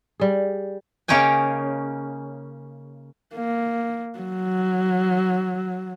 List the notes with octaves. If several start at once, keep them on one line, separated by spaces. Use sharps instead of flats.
G3 G#4
C#3 A#3 C#4 D#4 G5 G#5
A#3
F#3